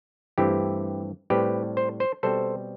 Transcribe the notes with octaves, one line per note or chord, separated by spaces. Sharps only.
G2 E3 A3 C4 E4 G4
A2 G3 C4 G4 B4
C5
C5
B2 G3 C4 A4 C5